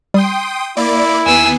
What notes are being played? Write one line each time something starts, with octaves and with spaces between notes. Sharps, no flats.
G3 G5 C6 D#6
A#3 E4 D5 D7
D#2 B3 G#5 E6 C7